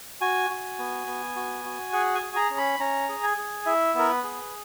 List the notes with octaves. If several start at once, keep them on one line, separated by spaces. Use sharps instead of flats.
F#4 G#5
F#4
B3
B3
F#4
F#4
G#4 F#5
G#5
G#4
A#5
C#4
B5
C#4 A#5
G#4
G#5
G#4
E4 E5
B3 A#4
B4
G#4